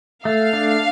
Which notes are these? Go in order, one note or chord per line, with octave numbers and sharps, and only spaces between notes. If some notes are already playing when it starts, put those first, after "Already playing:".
A3 F5
D4